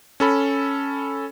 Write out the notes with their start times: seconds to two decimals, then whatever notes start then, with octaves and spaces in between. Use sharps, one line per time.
0.20 C#4 A4 B5